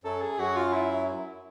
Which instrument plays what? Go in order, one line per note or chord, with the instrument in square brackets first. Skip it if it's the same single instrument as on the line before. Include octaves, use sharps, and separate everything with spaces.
[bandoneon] F#2 F#3 [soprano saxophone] A4
[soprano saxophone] G#4
[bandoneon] F#2 F#3 [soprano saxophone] F#4
[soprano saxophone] F4
E4